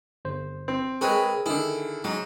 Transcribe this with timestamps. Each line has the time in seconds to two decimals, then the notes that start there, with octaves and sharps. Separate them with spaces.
0.25 G1 C5
0.68 C4
1.01 G#3 C4 G#4 A#4 B4 C#6
1.46 D3 D#3 E4 G#4
2.04 G#2 F#3